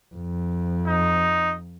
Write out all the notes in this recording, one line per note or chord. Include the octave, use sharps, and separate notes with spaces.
F2
D#4